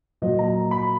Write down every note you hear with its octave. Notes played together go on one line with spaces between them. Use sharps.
A#2 F#3 D#5
A#5
B5